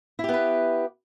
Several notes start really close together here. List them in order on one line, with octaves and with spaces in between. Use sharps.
E4 G4 B3 B4